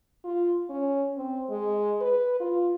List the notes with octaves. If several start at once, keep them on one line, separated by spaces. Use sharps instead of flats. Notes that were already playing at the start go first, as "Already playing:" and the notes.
F4
C#4
C4
G#3
B4
F4